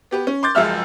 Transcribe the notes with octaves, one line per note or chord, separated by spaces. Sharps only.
B3 G4 B4
C#4
C6 D6 G6 A6
F#1 C#2 F3 E5 E6 F6